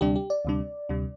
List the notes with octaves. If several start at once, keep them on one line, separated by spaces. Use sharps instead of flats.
D2 C3 G3 D4 G4
G4
D5
D2 C3 G3 D4
D2 C3 G3 D4